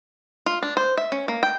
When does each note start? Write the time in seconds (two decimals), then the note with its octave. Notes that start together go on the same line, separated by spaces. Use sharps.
0.46 F4
0.63 D4
0.77 C5
0.97 E5
1.12 C#4
1.28 A#3
1.43 G5